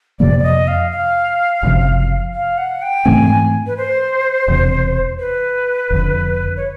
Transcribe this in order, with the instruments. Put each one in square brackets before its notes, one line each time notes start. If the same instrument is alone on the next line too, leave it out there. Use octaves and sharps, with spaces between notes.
[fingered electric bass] F2 C3 F3 A#3 [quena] D5
[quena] D5
D#5
F5
F5
[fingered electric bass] F#1 E2 C3 F3
[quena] F5
F#5
G5
[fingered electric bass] G#2 E3 A3 C4 [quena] G#5
[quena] B4
C5
[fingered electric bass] E1 E2 C3
[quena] B4
[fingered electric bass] F1 F2 D3
[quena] C#5